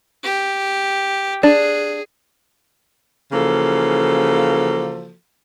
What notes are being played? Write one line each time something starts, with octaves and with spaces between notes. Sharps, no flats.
G4
D4 G#4
C#3 E3 F3 A#3 F#4 A4